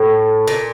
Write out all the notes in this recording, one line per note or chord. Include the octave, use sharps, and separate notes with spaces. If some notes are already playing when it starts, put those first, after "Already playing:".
Already playing: A2
A#2